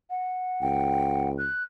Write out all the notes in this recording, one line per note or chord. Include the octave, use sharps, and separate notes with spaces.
F#5
C#2 G5
F#6